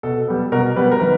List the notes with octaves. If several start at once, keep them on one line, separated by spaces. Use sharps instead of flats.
B2 A4
G3 B3
B2 A#4
G3 B3 B4
A#4
D#3 B4